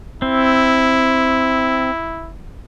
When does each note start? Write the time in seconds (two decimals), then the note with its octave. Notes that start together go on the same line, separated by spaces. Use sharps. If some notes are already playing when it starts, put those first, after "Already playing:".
0.22 C4 E4